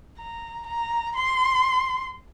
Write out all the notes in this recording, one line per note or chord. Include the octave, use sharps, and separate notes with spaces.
A#5
A#5
C6